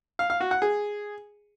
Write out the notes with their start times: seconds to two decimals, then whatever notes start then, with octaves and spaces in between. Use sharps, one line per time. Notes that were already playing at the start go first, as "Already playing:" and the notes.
0.19 F5
0.30 F5
0.40 F#4
0.51 F#5
0.62 G#4